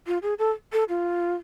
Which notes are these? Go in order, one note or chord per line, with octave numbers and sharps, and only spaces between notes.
F4
G#4
A4
A4
F4